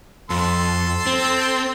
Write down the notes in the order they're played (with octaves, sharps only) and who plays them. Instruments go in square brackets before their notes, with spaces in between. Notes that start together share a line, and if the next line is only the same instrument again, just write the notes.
[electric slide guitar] F2 [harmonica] A4 C6
[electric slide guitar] C4